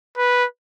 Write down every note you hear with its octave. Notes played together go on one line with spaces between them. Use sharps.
B4